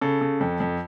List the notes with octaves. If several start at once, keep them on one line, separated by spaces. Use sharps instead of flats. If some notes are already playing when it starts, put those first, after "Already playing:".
C#3 A4
C#3
F2
F2